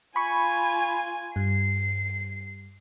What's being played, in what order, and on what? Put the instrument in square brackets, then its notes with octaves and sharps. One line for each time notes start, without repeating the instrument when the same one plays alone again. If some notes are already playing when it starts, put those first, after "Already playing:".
[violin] F4 G#5 [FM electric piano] B5 C#6
[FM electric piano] G2 [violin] C7